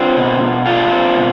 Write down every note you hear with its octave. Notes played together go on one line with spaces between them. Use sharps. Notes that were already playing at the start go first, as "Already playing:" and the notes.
Already playing: C4 D4 F4
B2
B2
A3 D4 F4
C4
B2